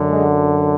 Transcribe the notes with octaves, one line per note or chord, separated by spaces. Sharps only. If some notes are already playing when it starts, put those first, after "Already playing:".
Already playing: F#2 D3
G#3